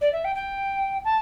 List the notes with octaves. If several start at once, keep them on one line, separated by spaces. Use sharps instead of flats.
D5
E5
G5
G5
A5